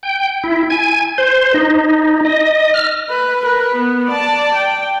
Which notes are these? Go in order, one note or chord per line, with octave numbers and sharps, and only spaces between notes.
G5
E4
G#5
C5
D#4
D#5
F6
B4
A#4 B4
B3
D5 A5
G5